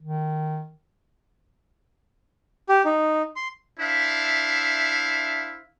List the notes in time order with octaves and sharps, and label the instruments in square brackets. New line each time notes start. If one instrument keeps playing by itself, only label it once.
[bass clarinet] D#3
[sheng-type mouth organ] G4
D#4
C6
[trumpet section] D4 E4 C5 E5 F5